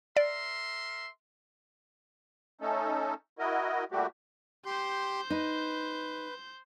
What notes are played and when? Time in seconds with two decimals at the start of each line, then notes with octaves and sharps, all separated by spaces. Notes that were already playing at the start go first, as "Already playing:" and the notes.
0.17 A#4 D5 E5 C6
2.61 A3 C#4 D#4 A4
3.39 E4 F#4 A#4 D#5
3.92 A#2 G3 A3 F#4 G4
4.66 G4 C5 C6 G6
5.30 D#4 B4